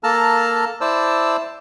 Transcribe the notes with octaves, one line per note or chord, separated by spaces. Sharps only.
A#3 A4 A5 A#5 F6
E4 C5 D5 A5 E6